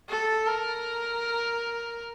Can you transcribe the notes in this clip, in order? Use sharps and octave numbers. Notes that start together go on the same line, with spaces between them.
A4
A#4